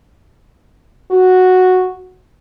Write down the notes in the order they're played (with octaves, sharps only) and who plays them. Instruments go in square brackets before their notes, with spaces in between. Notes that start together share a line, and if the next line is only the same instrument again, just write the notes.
[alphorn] F#4